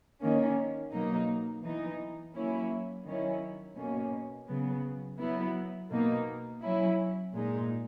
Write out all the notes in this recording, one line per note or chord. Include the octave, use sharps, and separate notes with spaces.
D#3 A#3 C#4
B2 F#3 A#3 D#4
E3 B3 D#4
F#3 A#3 C#4 E4
D#3 F#3 C#4 E4
B2 A#3 C#4
C#3 F#3 B3
F#3 B3 E4
B2 A#3 D#4
F#3 C#4 E4
A#2 G#3 D#4